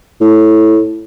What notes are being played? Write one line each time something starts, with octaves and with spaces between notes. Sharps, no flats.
A2